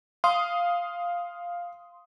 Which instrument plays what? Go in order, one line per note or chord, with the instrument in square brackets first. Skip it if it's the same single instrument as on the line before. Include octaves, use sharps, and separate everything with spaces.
[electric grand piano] F5 D#6 [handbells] C6